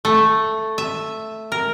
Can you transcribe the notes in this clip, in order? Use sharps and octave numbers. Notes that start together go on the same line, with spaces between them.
A3
E5
A#4